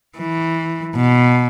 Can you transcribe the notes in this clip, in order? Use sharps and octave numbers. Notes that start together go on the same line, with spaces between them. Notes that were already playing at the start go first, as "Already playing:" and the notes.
E3
B2